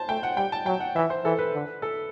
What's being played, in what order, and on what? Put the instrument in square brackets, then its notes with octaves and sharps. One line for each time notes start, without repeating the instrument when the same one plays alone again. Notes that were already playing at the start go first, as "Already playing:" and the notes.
Already playing: [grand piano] C5 A5
[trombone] A3 [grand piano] G5
[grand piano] F#5
[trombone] G3 [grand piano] G5
[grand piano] A5
[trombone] F#3 [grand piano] G5
[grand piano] F#5
[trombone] E3 [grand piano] E5
[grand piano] C5
[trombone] E3 [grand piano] A4
[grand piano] B4
[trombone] D3
[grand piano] A4